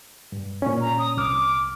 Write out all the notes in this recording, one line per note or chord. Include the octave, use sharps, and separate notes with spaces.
G2
A#2 C#4
A#5
D#6
C2 D6 F6